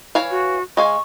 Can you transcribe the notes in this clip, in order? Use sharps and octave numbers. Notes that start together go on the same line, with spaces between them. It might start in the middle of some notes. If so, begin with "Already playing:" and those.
E3 C#5 F5
F#4
G#3 F5 G#5 C#6